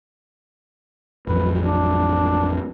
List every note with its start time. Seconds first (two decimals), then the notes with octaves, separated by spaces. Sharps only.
1.27 A1 F2 F#3 B4
1.62 D4